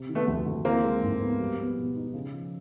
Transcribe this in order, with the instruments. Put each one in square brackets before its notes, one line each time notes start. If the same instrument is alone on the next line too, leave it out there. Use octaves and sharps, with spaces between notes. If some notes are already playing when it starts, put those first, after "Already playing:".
Already playing: [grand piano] C3
D#3
[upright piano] A3 B3
[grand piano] D2
D2
[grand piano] E3 [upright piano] A#3 C4
[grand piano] G#3
G#2
B3
G3
B3
B2
D#4
C#3
F3